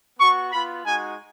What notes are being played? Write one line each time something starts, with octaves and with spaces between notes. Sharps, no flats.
B3 F#4 C#6
B3 F4 B5
G#3 D#4 F#4 G#5